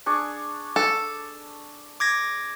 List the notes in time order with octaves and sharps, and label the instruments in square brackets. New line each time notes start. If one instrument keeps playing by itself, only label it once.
[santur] D4 G#4 C#6
[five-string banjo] A4
[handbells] D6 G#6 A#6